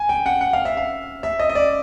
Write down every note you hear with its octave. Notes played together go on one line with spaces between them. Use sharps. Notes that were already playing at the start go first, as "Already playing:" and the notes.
Already playing: G#5
G5
F#5
F#5
F5
E5
F5
E5
D#5
D#5
D5